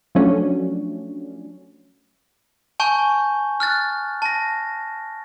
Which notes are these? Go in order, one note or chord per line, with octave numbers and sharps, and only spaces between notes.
F3 F#3 A3 C#4 D4 F#4
G#5 A5 C#6 G6
F6 F#6 A6
A5 A#6